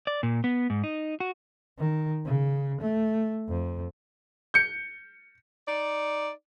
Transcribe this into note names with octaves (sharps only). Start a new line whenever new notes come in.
D5
A#2
B3
G#2
D#4
F#4
D#3
C#3
A3
F2
G6 C#7
D#4 D5